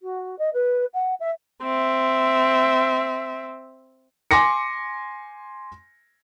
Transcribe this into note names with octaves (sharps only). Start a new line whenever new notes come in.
F#4
D#5
B4
F#5
E5
C4 E5
G#5 C6 D6 A#6 C#7